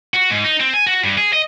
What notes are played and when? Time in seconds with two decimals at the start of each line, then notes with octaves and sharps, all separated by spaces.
0.14 F#4
0.30 G#2
0.44 D#4
0.60 C4
0.74 G#5
0.86 F#4
1.04 G2
1.18 G#4
1.33 D#5